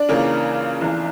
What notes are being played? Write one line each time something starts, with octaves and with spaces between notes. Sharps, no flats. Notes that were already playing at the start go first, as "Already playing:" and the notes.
Already playing: D4 D5
C#2 C#3 E3 A#3 C#4
F1 E2 E3